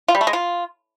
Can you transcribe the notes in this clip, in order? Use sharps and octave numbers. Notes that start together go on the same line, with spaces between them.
F4
G3
A3
G#3
F4